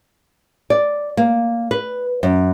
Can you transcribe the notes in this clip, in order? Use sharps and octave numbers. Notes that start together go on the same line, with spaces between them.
D5
A#3
B4
F#2